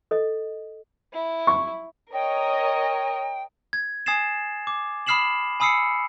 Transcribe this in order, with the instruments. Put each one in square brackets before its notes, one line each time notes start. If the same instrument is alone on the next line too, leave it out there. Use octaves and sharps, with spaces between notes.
[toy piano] A4 D#5
[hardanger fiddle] E4
[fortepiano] C#6
[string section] A#4 C#5 D#5 [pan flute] G5
[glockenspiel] G#6
G#5 D#6 G#6 A6 C7 E7
D6
B5 D#6 F6 C7 E7 F#7
G#5 B5 D#6 E6 C7 C#7